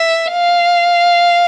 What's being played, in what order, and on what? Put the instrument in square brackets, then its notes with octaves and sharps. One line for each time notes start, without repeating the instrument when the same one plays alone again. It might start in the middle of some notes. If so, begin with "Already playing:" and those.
Already playing: [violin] E5
F5